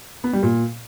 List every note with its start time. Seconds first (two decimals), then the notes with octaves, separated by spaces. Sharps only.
0.24 B3
0.33 G3
0.43 A#2